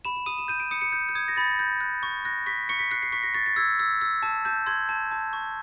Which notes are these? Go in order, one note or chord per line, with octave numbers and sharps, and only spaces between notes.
B5 E7
E7
D#6 D#7
E7
G6 D#7
D7
D#6 C#7
C#7
G6
G6
D#6 G#6
A#6
B5 A6
G6
F#6
C#6
F#6 A#6
C#6 B6
C#6 C#7
B6
F#6 C7
C7
C#6 B6
A#6
C#6 A6
A6
E6 G#6
E6
E6
A5
A5 G6
C6 G#6
A5
A5
C#6